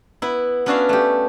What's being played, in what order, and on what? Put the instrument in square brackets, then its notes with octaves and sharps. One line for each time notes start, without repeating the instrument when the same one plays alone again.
[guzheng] B3 E4
B3 C#4 D4 F#4 E5 F5
A3 G4